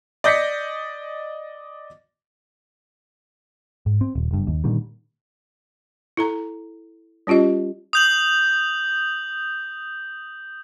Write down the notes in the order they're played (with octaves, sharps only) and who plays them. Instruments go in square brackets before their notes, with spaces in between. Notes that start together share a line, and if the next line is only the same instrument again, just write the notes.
[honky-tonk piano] D5 D#5 G6 A#6 B6 C#7
[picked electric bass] G#2
C4
D#1
F#1 G2
D#2
A#2 D3 D#3 G3
[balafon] E4 A4 A#5
G3 C#4 F4 G4 D#5
[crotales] D#6 G6 F#7